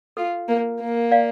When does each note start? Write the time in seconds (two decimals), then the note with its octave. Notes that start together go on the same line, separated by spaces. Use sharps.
0.17 F4 A4
0.48 A#3
0.80 A#3
1.11 D5 F5